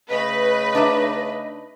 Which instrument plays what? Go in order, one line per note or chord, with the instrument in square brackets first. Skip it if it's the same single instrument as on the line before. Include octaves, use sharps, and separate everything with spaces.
[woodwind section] C#3 A3 D#5 [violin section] B4
[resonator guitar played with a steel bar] D4 D#4 E5